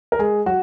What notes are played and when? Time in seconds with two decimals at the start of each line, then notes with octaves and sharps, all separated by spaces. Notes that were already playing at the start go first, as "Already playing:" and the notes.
0.12 A#4
0.19 G#3 G#4
0.46 F#3 F#4